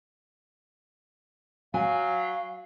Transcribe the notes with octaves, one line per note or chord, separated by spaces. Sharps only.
F#3 F5 G#5